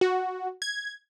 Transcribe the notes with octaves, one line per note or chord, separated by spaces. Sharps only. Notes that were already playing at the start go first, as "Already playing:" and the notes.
F#4
G#6